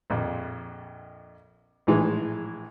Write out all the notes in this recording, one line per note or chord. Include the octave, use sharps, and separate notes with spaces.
A#1 F2
A#1 A2 E3 G#3